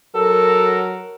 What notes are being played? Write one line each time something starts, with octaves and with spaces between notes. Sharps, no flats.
F#3 F#4 A4 A#4